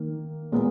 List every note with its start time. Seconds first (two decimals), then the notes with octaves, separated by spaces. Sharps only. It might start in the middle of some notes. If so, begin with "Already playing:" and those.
Already playing: D#3 A#3
0.52 A#2 G#3 B3